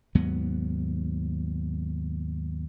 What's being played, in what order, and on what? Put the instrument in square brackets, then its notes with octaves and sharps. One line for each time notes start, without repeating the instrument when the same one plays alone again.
[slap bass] D#2 G#2 F#3 B3